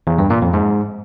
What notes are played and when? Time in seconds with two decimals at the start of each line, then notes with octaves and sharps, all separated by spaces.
0.07 E2
0.19 G2
0.30 A#2
0.42 F2
0.54 G#2